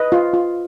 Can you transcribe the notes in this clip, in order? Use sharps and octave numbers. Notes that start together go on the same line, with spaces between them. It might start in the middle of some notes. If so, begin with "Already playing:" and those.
Already playing: B4 D#5
F4
F4